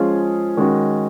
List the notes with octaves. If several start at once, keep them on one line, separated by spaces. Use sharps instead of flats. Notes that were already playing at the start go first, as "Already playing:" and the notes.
Already playing: F3 G#3 C#4 F4 G#4
D#3 G#3 C#4 F#4